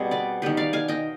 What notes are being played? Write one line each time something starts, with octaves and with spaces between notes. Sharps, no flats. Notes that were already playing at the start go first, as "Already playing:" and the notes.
Already playing: B2 G3 C4 G#4
B4 D5
D#3 B3 G4 B4
D5 F5
F5 G#5
D#5 G5